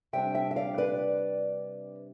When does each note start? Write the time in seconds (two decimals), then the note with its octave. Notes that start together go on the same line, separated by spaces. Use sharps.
0.13 C3 G3 D4 E5 G5
0.35 E5 G5
0.51 E5
0.56 D5 F5
0.78 B4 D5